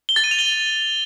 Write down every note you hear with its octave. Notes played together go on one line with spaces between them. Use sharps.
G7
A6
D#7
F7
G7